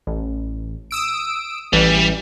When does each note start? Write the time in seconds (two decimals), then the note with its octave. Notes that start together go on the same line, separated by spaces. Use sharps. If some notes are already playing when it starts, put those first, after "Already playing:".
0.07 A1
0.91 D#6 E6 D7
1.73 A1 E3 G3